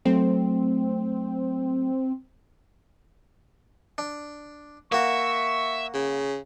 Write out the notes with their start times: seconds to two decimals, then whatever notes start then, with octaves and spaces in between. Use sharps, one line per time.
0.05 F#3 A3 C4
3.98 D4
4.92 A#3 F#4 E5 C#6
5.94 C#3